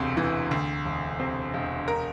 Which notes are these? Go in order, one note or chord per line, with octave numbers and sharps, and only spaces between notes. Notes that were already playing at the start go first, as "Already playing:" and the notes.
Already playing: E1 D2 C3
E3
D2
E1
C3 C5
E1
A#4